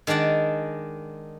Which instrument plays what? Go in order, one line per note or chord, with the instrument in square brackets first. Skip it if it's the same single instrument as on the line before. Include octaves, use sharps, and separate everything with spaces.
[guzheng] D#3 G#3 D4 D5 F#5